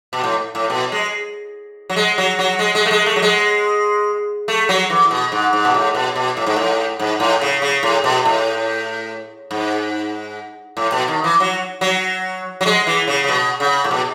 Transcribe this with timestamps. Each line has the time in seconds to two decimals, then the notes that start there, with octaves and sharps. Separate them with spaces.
0.13 B2
0.24 A2
0.55 A2
0.70 B2
0.92 G#3
1.90 F#3
1.96 G#3
2.18 F#3
2.39 F#3
2.59 G#3
2.75 G#3
2.86 A3
2.91 G#3
3.06 A3
3.16 F#3
3.22 G#3
4.48 A3
4.69 F#3
4.90 E3
5.11 B2
5.32 G#2
5.53 G#2
5.65 B2
5.74 A2
5.95 B2
6.16 B2
6.37 A2
6.46 G#2
6.56 A2
7.00 G#2
7.20 A2
7.41 C#3
7.62 C#3
7.83 A2
8.04 B2
8.25 A2
9.51 G#2
10.77 A2
10.92 B2
11.08 D#3
11.24 E3
11.40 F#3
11.81 F#3
12.61 F#3
12.66 G#3
12.87 E3
13.08 C#3
13.24 C#3
13.28 B2
13.60 C#3
13.84 A2
13.91 B2